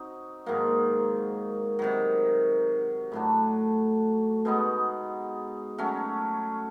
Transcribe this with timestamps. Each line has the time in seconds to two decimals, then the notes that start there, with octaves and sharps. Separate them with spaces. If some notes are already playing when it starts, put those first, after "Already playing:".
Already playing: C4 D#4 F#4
0.46 G#2 D#3 F#3 A#3
1.79 C3 D#3 F#3
3.12 A2 F#3 A3 D4
4.45 B2 G#3 B3 D#4
5.78 F#3 A3 C#4